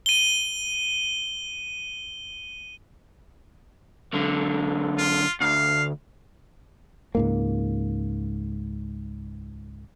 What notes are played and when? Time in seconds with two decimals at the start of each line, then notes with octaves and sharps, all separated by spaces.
0.06 D#7 G7
4.13 B1 D3
4.98 F4
5.41 D2 F5
7.15 C#2 G#2 A#3